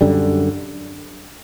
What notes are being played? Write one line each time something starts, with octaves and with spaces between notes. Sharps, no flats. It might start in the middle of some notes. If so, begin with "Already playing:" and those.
F#2 D3 G3